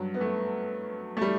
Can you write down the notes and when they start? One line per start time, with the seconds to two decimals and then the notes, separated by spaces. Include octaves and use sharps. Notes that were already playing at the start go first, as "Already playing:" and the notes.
Already playing: G2 F#3
0.14 B3
0.21 A3
1.17 A3
1.21 G3